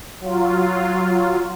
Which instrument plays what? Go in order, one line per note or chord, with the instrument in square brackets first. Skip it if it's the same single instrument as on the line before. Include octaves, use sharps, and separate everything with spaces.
[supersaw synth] F#3 F4